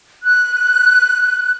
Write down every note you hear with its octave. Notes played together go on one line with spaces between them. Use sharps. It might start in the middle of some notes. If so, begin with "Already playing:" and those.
F#6